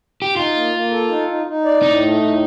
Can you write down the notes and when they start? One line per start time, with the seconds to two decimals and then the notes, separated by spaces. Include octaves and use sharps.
0.22 G4
0.36 D#4 F4
0.55 A#3
0.73 A#3
0.91 A4
1.09 D#4
1.28 D#4
1.46 D#4
1.64 D5
1.82 A2 D#4
2.02 A3
2.20 A2